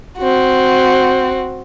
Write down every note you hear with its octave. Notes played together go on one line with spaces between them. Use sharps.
C4 F#4